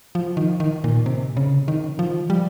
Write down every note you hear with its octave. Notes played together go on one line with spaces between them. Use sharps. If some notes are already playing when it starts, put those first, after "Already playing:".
F3
D#3
D#3
A#2
C3
C#3
D#3
F3
G3